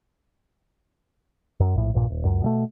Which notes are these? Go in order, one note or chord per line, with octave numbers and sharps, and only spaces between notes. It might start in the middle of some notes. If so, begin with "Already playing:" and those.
F#2
A#1 A2
A#1 G2 A#2
D#1
C#2 F#2
B2 G3 A3